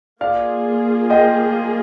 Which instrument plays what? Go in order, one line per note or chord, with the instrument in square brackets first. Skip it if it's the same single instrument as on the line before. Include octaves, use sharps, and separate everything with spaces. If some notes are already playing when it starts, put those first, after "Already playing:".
[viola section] A#3 F4 G#4 [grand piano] D5 F5
[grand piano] D#5 G5